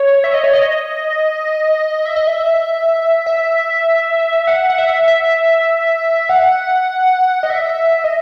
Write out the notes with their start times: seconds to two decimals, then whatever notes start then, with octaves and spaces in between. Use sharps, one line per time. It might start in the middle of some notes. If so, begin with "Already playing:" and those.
Already playing: C#5
0.24 E5
0.34 D#5
0.44 C#5
0.53 D#5
2.05 E5
2.16 D#5
2.27 E5
3.26 E5
4.47 F#5
4.70 F#5
4.78 E5
5.08 E5
6.29 F#5
7.43 D#5
7.50 E5
8.04 D#5